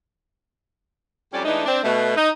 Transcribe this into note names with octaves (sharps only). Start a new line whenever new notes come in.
F2 F#3 G3 C#4 G4 D5
E3 G#3 A3 D4 D#4
C4 D4
B2 A3
D#4